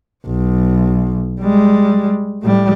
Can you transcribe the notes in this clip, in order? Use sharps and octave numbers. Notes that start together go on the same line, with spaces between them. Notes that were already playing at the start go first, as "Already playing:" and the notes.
B1
G3 G#3
A2 G3